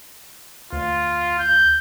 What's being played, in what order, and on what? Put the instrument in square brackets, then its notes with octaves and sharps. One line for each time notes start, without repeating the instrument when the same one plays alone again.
[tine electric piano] D2 [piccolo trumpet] F4
[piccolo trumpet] G6